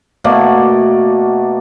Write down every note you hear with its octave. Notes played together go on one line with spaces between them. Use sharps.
B2 A3 A#3 D5